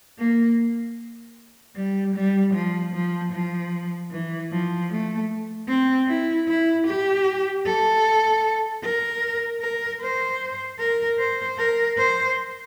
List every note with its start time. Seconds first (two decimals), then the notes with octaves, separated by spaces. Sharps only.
0.18 A#3
1.76 G3
2.15 G3
2.54 F3
2.94 F3
3.33 F3
4.11 E3
4.51 F3
4.91 A3
5.68 C4
6.08 E4
6.48 E4
6.87 G4
7.66 A4
8.83 A#4
9.61 A#4
10.01 C5
10.79 A#4
11.19 C5
11.58 A#4
11.98 C5